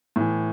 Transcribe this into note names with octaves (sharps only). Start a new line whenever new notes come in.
A2 E3